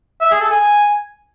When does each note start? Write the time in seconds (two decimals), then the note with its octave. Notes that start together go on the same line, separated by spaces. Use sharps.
0.21 E5
0.31 G#4
0.41 A4
0.50 G#5